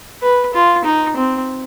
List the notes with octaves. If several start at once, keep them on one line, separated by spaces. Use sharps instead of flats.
B4
F4
D#4
C4